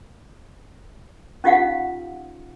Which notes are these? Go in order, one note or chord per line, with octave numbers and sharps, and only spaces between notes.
C#4 D#4 F4 G4 F5 F#5